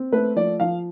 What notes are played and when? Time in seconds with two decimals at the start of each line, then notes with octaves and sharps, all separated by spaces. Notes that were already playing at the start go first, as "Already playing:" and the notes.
Already playing: C4
0.12 A3 B4
0.36 F3 D5
0.60 F3 F5